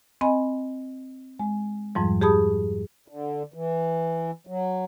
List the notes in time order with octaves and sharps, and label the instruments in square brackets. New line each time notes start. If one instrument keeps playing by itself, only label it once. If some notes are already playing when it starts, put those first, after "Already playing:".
[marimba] C4 D#5 G#5 B5
G#3
F2 G#2 F3 G3
G4 G#4 A5 B5 D#6
[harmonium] D3
E3
F#3